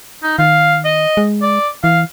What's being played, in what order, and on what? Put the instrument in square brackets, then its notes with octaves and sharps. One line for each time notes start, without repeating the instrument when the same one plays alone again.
[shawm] D#4
[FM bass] D#3 [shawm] F5
[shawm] D#5
[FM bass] G#3
[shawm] D5
[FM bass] E3 [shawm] F5